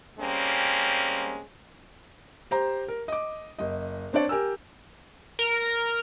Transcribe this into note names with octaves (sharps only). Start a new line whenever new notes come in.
G3 G#3 A#3 C4 C#4
G4 C5 A#5
A#4
D#5 D6
F#1 D#5
C4 D4 C#5 D5
G4 A#4 G#5 E6
A#4